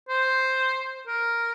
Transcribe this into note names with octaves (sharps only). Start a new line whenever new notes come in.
C5
A#4